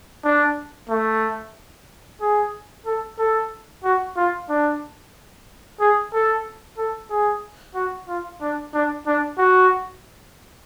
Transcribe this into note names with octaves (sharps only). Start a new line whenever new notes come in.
D4
A3
G#4
A4
A4
F#4
F4
D4
G#4
A4
A4
G#4
F#4
F4
D4
D4
D4
F#4